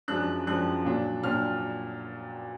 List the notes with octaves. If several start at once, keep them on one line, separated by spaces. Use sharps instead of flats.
F#2 F3 G#3 D4 F#6
F#2 F3 G#3 D4 F#6
A#2 F#3 D4
A#2 F#3 D4 F6